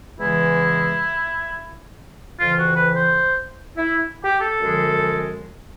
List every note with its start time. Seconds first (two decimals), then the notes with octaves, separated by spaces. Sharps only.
0.19 E2 C#3 E3 G#3 E4
2.39 F2 C#3 E3 F4
2.58 F#4
2.76 B4
2.95 C5
3.77 E4
4.24 G4
4.41 A4
4.60 F#2 D3 F3 G#3